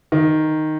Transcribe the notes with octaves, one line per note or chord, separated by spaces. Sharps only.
D#3